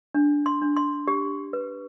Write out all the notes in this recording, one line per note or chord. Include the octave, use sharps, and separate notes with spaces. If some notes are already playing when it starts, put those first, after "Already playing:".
D4
C6
D4
C6
G4
B4